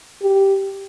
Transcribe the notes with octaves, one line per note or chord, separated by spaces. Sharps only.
G4